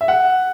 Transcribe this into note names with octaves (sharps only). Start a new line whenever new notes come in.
E5
F#5